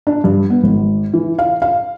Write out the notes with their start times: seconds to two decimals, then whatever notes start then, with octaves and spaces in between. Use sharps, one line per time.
0.07 D4
0.24 G2
0.50 B3
0.63 G#1
1.14 E3
1.39 F5
1.62 F5